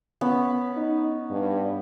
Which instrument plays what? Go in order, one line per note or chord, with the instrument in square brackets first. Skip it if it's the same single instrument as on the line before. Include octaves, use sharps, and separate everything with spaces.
[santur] B3 C#4 B4
[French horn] D#4
G2